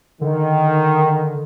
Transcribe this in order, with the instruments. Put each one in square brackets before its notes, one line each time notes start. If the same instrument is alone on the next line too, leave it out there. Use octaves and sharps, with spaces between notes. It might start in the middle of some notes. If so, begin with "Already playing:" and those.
[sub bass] D3 [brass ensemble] D#3